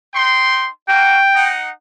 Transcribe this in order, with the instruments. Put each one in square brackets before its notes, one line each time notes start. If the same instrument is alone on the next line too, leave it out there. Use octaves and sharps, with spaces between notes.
[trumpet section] D#4 G5 C6
[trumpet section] A#3 F#4 [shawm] G5
[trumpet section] D#4 F#5